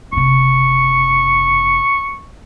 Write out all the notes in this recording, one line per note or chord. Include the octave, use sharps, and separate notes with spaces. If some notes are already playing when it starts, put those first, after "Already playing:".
F#1 C3 C#6